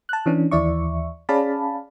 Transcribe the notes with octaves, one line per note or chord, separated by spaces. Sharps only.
A5 F#6
E3 C#4 D4
D#2 E3 D5 E5 C#6
C#4 G#4 D5 F5 A5 B5